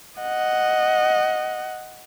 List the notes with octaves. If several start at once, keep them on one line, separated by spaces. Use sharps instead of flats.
D#5 F#5